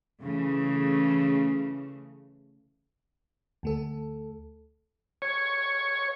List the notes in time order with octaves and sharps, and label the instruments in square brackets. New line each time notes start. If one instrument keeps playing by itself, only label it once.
[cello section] C#3 E3 A3
[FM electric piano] D2 A3 A4
[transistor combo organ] C#5